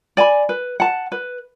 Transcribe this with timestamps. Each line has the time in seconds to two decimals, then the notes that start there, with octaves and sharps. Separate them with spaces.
0.17 D5 G#5 B5
0.49 B4
0.80 F#5 A5
1.12 B4